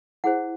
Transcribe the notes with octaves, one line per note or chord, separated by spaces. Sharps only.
E4 G#4 C5 F#5